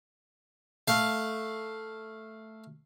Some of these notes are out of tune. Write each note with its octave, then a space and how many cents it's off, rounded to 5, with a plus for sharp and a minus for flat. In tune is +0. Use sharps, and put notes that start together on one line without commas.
A3 +0 F5 +0